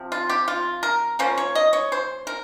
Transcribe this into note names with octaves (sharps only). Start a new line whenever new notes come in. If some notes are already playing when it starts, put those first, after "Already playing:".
Already playing: C3 F3 C4
F4
G4
F4
A#4
F3 A#3 C#4 C5
C#5
D#5
C#5
C5
A#4